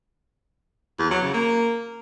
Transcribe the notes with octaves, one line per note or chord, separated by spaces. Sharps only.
E2
F#3
C#3
A#3